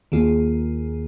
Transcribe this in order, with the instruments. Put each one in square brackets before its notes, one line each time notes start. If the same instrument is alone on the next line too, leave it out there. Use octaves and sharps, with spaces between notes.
[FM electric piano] D#2 D#3 A#3 F4 G#4